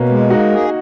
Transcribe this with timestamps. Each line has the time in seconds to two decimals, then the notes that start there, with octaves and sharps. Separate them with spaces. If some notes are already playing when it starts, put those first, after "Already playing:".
Already playing: B2 A#3 C#4
0.09 G#3
0.30 A#3 D#4 F#4
0.51 G#4